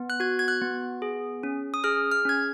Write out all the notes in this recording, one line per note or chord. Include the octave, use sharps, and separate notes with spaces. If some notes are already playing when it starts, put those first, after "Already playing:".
Already playing: B3
F#6
F#4 G#6
G#6
F#6
B3
G#4
C#4
D#6
G#4 F6
F6
C#4 G#6